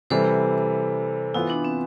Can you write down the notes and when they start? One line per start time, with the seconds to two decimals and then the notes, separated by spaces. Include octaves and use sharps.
0.10 C3 E3 G3 A4 C5
1.34 E3 B3 E4 F4
1.50 D4
1.65 C4